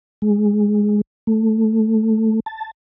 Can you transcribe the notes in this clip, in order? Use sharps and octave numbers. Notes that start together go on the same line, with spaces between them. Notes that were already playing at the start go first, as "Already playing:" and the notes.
G#3
A3
A5